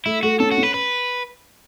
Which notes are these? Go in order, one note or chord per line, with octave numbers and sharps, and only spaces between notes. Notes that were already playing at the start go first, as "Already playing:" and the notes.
A3 E4
A3 F#4
C#4 A4
F#4
C#4
B4
B4